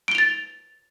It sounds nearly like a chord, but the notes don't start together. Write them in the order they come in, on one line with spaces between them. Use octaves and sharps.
D7 G7 F7 A6